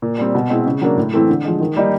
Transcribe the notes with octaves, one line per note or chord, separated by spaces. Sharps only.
A#2
G3 C4
B2
G#3 C4 E4
C#3
F#3 A#3 D4
A2
E3 A3 C4 E4
D3
F3 G#3
D#3
G3 A#3 D#4